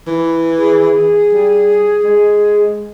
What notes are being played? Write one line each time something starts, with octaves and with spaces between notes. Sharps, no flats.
E3
G#4
G3
G#3